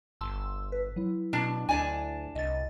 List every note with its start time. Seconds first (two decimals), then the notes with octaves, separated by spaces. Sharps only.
0.21 G1 A5 C6 E6
0.72 B4
0.96 F#3 E4
1.33 B2 D4
1.69 D2 D4 D5 G#5
2.35 C2 D#5 A6